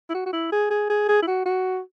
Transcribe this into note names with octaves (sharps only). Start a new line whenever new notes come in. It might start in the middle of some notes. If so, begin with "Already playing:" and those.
E4
F#4
F#4
E4
G#4
G#4
G#4
G#4
E4
F#4
F#4